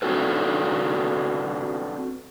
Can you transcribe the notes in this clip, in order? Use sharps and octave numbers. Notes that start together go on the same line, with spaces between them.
C4 D4 F#4 A4 B4